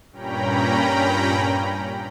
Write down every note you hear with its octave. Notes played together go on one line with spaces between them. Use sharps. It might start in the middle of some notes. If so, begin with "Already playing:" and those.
G2 A#2 C#4 G5 A#5 B5